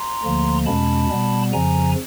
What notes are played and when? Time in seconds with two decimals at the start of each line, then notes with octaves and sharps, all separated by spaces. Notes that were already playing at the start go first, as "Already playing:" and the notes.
Already playing: A#5 C6
0.23 D2 D3 F3 A#3
0.66 E2 B2 G#3 C#4 A5 B5
1.10 B2 G3 B3
1.52 F2 C#3 F3 G#5 A#5